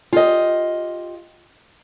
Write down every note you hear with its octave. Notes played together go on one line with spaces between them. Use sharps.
F4 G4 D#5